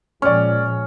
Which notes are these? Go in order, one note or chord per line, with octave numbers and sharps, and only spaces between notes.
A#2 F3 G#3 C#4 D5 C#6